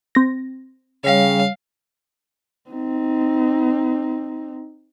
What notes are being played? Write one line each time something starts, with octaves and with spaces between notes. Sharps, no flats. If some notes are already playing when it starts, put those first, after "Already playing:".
C4 A#6
C#3 G3 C#5 F5
C4 D#4